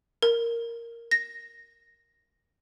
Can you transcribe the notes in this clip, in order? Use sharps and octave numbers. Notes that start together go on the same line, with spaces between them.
A#4
A#6